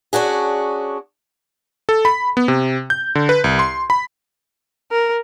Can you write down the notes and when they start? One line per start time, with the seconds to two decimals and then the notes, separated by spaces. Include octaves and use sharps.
0.13 C#4 D4 F#4 G#4
1.89 A4
2.05 B5
2.37 B3
2.48 C3
2.90 G6
3.15 D3
3.29 B4
3.44 C2
3.59 C6
3.90 B5
4.91 A#4